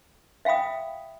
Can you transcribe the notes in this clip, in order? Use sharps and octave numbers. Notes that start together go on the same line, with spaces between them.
E5 F5 G5 B5 D#6